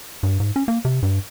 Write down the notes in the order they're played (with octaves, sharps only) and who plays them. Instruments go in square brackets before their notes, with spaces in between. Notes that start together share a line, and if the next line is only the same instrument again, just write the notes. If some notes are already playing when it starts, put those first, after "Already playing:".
[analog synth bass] G2
G#2
C#4
A#3
C3
G2